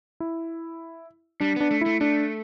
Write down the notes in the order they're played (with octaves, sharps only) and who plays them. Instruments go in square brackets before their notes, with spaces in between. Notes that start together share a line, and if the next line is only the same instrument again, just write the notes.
[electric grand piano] E4
[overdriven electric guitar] G3 [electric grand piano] D4
[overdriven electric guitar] B3 [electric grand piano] D4
[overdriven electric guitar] A3
[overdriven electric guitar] A3 [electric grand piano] E4
[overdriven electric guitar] A3 [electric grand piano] D4